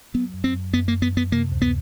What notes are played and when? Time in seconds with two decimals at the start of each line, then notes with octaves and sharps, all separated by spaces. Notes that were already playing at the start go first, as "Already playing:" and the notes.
0.14 F#3 B3
0.34 F#2
0.44 C4
0.54 F#2
0.74 F#2 B3
0.88 A#3
0.93 F#2
1.02 B3
1.12 F#2 B3
1.32 C3 A#3
1.52 D2
1.62 B3